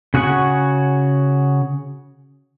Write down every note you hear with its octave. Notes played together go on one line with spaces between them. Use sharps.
C#3 F#4 G#4 F#5 C#6